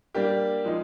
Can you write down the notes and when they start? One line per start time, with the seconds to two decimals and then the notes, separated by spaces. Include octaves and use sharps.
0.15 G3 A#3 D4 G4
0.65 F3 G#3 D#4